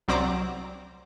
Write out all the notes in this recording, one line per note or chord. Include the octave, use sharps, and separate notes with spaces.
C2 F#3 C4 D5 A#5 D6